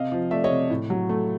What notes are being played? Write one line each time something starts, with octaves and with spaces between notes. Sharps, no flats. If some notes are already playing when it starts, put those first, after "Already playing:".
Already playing: C3 D#5 F5
F3
A3 D5 E5
C#5 D#5
C3
A2
F#3
A3